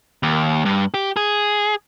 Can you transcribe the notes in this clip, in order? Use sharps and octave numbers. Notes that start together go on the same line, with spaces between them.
D#2
G2
G4
G#4